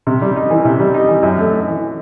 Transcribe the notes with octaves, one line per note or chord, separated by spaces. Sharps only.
C3
G3
D#4
E3
C3
G3
D#4
E3
F#2
A3
D#4
E3